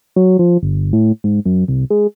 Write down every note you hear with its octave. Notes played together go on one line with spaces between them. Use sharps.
F#3
F3
G1
A2
G#2
F#2
C2
G#3